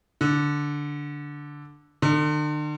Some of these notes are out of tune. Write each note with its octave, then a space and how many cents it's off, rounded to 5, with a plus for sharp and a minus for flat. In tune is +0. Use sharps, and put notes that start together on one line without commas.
D3 -5
D3 +45